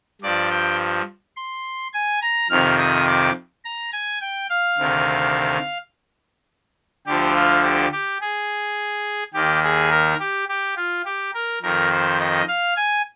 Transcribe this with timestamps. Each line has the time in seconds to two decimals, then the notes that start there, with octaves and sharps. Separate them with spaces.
0.22 G2 F3 D5
0.51 G5
1.37 C6
1.93 G#5
2.22 A#5
2.50 F2 C3 D#3 F6
2.79 D#6
3.07 D6
3.65 A#5
3.92 G#5
4.21 G5
4.50 F5
4.78 D2 C3 D#3
7.07 D2 D3 F3 G4
7.35 F4
7.63 G4
7.92 G4
8.21 G#4
9.34 D#2 D#3 G4
9.64 G#4
9.91 A#4
10.20 G4
10.49 G4
10.76 F4
11.05 G4
11.34 A#4
11.62 F2 D#3 A#4
11.92 C5
12.20 D#5
12.48 F5
12.76 G#5